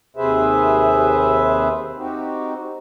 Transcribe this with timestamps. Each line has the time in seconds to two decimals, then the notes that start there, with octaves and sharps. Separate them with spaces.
0.17 D#2 C3 G#4 B4 C5 E5
1.98 C4 D#4 F#4 G4